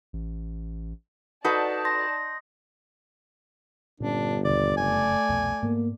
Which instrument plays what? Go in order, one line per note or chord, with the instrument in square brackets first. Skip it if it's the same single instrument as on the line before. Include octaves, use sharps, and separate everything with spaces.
[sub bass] A1
[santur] D#4 [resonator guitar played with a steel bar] F#4 A4 B4 [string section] D5 A5
[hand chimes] C6 A#6
[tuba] G1 [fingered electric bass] A#2 C#4 [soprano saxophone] D4
[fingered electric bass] D#2 B2 D3 [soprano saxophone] D5
[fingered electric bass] F1 F#2 C#3 [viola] A3 D5 [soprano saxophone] G#5
[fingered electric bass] C2 F2 B2
[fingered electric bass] G#2 G3 B3 [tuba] A#3